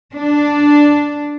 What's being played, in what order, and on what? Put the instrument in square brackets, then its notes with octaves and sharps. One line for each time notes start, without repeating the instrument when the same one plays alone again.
[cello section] D4